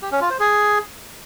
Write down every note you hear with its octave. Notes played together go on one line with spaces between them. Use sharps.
G4
C#4
F4
C5
G#4